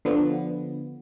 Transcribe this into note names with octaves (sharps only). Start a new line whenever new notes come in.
D3 F3 B3